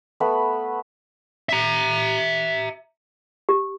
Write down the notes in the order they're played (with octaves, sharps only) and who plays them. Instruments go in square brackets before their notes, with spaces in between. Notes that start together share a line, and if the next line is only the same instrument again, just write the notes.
[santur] A3 B3 B4
[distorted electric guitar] E5 A#5
[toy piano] G4